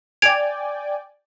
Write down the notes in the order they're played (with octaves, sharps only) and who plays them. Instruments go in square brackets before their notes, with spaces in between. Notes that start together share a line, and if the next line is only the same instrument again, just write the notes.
[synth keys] D5 G5 G#5 [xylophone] G#6 D7 F7